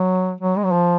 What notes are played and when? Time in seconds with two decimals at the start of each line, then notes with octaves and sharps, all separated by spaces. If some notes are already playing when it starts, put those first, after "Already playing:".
Already playing: F#3
0.41 F#3
0.56 G#3
0.64 F#3
0.72 F3